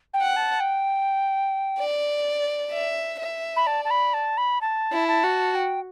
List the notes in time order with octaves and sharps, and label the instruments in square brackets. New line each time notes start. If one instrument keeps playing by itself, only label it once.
[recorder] G5
[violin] F#5
[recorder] A5
G5
[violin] D5
E5
E5
[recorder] B5
[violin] D5 [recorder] A5
[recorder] A5
B5
A5
B5
A5
[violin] E4
[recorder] A5
[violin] F#4
[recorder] G5